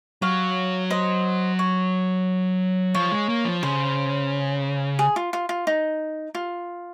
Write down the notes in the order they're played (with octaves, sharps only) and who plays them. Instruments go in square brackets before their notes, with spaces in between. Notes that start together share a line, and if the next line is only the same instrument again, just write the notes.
[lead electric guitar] F#3 [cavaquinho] C#5 F5
[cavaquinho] C5 D#5
C#5
[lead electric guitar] F3 [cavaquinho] C#5
[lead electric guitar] G#3
A#3
F3
[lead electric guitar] C#3 [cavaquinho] C5
[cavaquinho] G#4
F4
F4
F4
D#4
F4